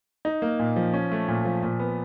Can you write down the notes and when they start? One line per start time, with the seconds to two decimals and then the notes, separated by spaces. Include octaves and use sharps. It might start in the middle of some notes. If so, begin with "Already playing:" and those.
0.25 D#4
0.42 A#3
0.59 A#2
0.76 F3
0.94 C#4
1.11 A3
1.28 A#2
1.45 F3
1.63 A#2
1.79 B3